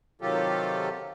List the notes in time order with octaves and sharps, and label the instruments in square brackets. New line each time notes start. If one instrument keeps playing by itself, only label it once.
[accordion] C3 D#3 F#3 F4 G4 A4